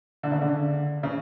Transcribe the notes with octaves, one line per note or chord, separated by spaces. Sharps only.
D3
C#3
D3
C#3